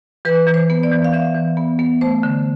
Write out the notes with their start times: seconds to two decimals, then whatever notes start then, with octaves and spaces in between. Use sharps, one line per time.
0.25 E3 B4
0.47 E3
0.54 C5
0.70 B3
0.83 D5
0.91 E3
1.04 F5
1.13 E3 E5
1.35 E3
1.57 B3
1.79 B3
2.01 A3 C5
2.23 D3